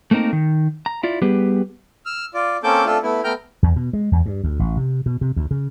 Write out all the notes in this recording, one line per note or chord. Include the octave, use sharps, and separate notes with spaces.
A3 A#3 C4 D#4 A#4
D#3
A#5
E4 F4 D5
G3 B3 G4 G#4 B4
E6 F6
F4 D5
A#3 C4 C#4 A4 D6 G6
A3 C4 D4 F4 A4
A3 B3 E4
A3 B3 G5 A#5 F6 G6
E2
B2
G#3
E2
G2
D2
A1
C3
B2
C3
D2
C#3